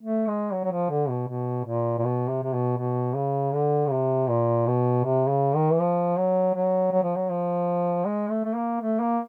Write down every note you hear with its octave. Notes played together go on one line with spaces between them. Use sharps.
A3
G#3
F#3
F#3
F3
D3
B2
B2
A#2
A#2
B2
C3
C3
B2
B2
C#3
D3
C#3
C3
A#2
B2
C3
C#3
D#3
E3
F3
F#3
F#3
F#3
F3
F#3
F3
G#3
A3
A3
A#3
A3
A#3